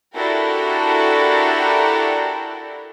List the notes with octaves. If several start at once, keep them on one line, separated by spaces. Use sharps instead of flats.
D4 E4 F#4 G4 A4 A#4